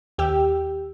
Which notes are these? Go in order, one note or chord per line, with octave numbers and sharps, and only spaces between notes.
D#2 G4 G5 E6